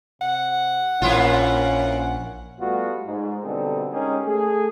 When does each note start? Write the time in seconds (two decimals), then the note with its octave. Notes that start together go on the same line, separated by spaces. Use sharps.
0.21 C3 F#5
1.02 A#1 A#3 C#4 E4 F4
2.60 G3 A3 B3 F4 F#4
3.06 G#2
3.43 B2 D3 G3 C4 D#4 A4
3.92 G#3 C#4 D#4 G4 G#4 A#4
4.26 A3 G#4